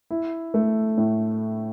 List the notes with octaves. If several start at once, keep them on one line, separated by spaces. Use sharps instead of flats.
E4
A3
A2